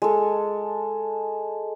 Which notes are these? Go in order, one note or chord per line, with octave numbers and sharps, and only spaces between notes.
G#3 A4